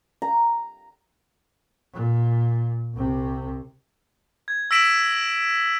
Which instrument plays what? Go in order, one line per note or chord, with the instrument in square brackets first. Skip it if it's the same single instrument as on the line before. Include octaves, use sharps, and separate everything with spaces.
[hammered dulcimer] A#5
[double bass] A#2
C2 C3
[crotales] G#6
E6 A#6 B6 D7 E7 F#7